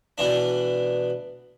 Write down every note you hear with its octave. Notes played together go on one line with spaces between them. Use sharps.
B2 E3 D4